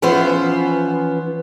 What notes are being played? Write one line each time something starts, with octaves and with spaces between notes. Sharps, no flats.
E3 F3 B3 C#4 F4 C5